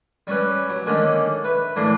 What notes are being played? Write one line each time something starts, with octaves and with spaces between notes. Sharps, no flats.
G3 C#4 B4
F#3
D3 D#3 A#3 C#4 D4
B4 E5
A2 E3 A#3 D4 C6